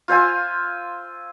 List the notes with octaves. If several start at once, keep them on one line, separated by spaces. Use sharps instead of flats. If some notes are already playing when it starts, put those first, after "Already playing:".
F4 C5 E5 G#5